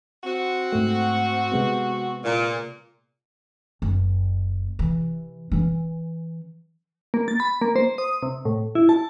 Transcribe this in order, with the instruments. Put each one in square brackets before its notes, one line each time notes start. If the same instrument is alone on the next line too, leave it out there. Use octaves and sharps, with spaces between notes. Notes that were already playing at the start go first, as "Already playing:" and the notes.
[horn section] C4 F#4
[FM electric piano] G#2 A3
C3 G#3 B3
[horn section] A#2
[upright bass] F#1
C3 E3
E3 C#4
[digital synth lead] A#3
A6
B5
A#3
C5
D#6
C3
A2
E4
A5